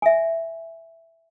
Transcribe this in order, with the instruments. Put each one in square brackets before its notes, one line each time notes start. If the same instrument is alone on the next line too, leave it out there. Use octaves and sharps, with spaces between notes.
[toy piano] E5 G#5